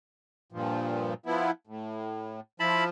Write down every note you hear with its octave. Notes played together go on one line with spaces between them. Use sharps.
G2 A#2 F3
F3 B3 E4
A2
F3 E4 A5 B5